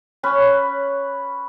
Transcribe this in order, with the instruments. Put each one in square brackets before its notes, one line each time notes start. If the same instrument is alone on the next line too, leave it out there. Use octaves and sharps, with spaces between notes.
[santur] C#4 B4